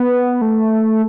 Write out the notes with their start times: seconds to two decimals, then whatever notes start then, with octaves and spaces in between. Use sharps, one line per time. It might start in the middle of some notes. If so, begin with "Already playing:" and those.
Already playing: B3
0.41 A3